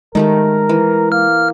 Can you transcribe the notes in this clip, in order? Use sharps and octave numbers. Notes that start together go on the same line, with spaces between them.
D#3 G#3 A3 G4 A#4
E3
A#3 F6